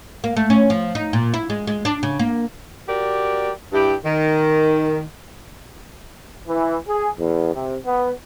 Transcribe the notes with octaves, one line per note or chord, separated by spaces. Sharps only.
A#3
A3
C#4
F3
D#4
A#2
E4
G#3
G#3
D4
C#3
A#3
F#4 G4 A#4 D5
G2 E4 G4
D#3
E3
G#4
E2
C3
B3